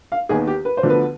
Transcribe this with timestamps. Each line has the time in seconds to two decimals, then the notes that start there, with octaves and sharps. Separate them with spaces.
0.12 F5
0.29 D#2 D#3 B3 G#4
0.47 G4
0.65 B4
0.77 C5
0.83 D2 D3 F3 B3
0.90 B4